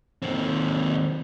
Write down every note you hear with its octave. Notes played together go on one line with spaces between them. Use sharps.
D#2 C4